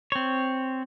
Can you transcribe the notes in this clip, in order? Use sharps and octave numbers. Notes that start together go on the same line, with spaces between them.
C4 C#5